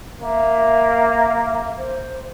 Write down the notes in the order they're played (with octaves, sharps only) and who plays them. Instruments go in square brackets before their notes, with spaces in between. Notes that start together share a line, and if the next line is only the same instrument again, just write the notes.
[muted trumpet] A#3 [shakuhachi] E5
[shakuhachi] C5